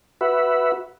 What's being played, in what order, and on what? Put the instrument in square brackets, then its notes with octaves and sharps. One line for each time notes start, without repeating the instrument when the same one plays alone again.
[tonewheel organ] F#4 B4 E5